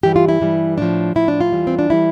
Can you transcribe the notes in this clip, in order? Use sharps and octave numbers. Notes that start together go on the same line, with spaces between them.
G2 E3 G3 G4
F4
E4
G2 E3 G3
A2 F3 D4
A2 F3 E4
D4
F4
E2 E3 G3
C4
D4
E3 G3 E4